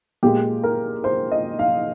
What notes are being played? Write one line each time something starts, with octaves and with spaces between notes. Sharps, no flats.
A#2 G#3 G4
A#4
C5
D#5
F5